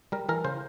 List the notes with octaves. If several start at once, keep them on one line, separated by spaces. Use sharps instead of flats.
G3 A#4
E3 A#4
C#3 C5